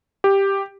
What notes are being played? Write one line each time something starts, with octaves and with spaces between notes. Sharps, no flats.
G4